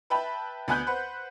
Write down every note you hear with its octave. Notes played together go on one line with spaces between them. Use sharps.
B4 E5 G5 A5 B5
D2 B3 G#5 F#6 G6
B4 C5 F#5